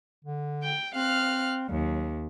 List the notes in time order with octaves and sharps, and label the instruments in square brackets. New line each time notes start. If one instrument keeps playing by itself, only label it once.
[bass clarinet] D3
[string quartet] G5
[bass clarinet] C4 [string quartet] F5 F6 F#6
[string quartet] D#2 [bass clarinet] F#3